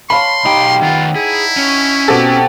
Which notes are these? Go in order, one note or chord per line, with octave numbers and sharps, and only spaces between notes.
C#5 F5 A5 B5 C6
B1 D#4 G4 G5
D#3 B3 F4 F#5
E4 G#4
C#4
B2 C4 G4 A4